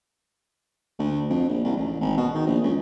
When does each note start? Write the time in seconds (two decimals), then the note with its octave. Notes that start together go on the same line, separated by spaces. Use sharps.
0.99 D2
1.30 F2
1.49 A#1
1.65 C2
1.77 A1
2.01 G#1
2.17 B2
2.35 D#3
2.47 A#1
2.64 C#2